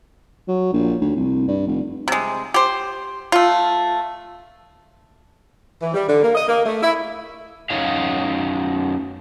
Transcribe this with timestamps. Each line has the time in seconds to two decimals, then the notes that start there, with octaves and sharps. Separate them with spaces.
0.48 F#3
0.73 A#1
1.01 D2
1.16 C2
1.48 G2
1.67 F1
2.08 C3 G#3
2.54 G4 C5
3.32 A3 F4
5.82 E3
5.94 G3
6.08 D3
6.23 A#3
6.35 D#5
6.48 A#3
6.66 A3
6.83 E4
7.70 F#2 D#4 C#5 F5